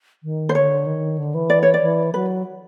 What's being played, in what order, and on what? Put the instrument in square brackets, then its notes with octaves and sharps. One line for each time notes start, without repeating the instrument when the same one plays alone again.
[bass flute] D#3
[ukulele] C5
[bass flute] D3 [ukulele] C#5
[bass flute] D#3
D3
E3
[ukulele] D5
C#5
D5
[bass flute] E3
[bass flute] F#3 [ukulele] B4